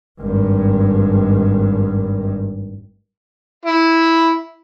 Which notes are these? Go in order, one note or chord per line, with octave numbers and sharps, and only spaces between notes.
G#1 G2
E4